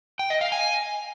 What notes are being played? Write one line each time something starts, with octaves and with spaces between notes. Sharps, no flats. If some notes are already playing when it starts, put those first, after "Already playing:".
G5
D#5
F5
G#5